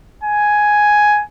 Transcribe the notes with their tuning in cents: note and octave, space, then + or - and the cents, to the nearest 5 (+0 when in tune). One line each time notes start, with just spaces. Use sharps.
G#5 +5